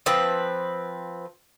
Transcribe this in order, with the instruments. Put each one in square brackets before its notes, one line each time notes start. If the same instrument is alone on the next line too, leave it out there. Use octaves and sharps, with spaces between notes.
[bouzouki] F3 C4 B4